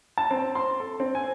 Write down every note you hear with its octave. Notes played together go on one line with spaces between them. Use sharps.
A5
C4
C6
A4
C4
G#5